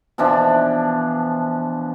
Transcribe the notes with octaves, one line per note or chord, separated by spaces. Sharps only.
B2 E3 F3 D4